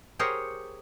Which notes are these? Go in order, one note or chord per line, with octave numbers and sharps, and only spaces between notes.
G4 G#4 A#4 C5 C#5 F#5